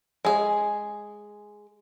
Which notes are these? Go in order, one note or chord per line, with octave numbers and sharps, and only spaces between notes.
G#3 G#4